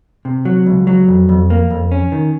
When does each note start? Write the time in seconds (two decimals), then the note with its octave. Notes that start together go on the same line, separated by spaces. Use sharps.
0.25 C3
0.45 F#3
0.66 C#2
0.87 F#3
1.08 F2
1.29 F2
1.50 A#3
1.70 F2
1.92 C#4
2.12 D#3